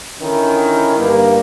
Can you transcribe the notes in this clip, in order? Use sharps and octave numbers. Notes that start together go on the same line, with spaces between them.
D3 D#3 C#4 E4
G2 A#3